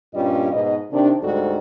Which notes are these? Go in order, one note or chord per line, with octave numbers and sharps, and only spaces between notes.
G2 A#2 G3 C#4 F4 D#5
G#2 B2 D#5
C3 D#3 D4
D2 G#2 G3 F#4 A4